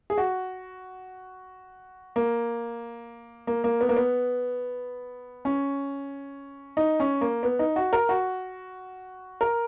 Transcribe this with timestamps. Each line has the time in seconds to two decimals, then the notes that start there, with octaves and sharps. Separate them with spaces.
0.10 G#4
0.18 F#4
2.16 A#3
3.47 A#3
3.64 A#3
3.81 B3
3.89 A#3
3.96 B3
5.45 C#4
6.77 D#4
7.00 C#4
7.21 A#3
7.43 B3
7.59 D#4
7.76 F#4
7.93 A#4
8.09 F#4
9.41 A#4